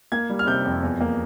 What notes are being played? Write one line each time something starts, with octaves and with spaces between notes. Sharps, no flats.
A#3 G#6
G3
F6
C3 G6
F2
E2
A#3